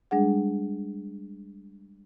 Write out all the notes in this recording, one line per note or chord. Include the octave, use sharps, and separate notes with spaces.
G3 G#3 D4 G#4 F#5